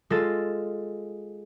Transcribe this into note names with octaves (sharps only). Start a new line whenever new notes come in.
G#3 F4 A4 A6